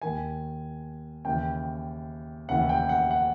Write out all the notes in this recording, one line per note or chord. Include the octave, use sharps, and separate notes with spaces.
D#2 D#3 G#5
D#2 C#3 E3 G5
F1 D#2 C#3 E3 F#5
G5
F#5
F#5